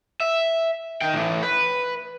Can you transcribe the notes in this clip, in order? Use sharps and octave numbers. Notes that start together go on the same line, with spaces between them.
E5
D#3 G5
A2 E3
B4